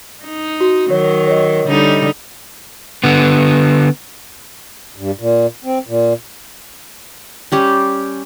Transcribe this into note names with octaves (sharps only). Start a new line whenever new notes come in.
D#4
F#4
D#3 F#3 C#5
C#5 D#5
D3 G3 D#4
D3 B3
G2
A#2
C4
A#2
G3 C#4 G4